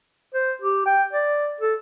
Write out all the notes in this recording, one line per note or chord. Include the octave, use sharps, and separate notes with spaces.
C5
G4
G5
D5
A4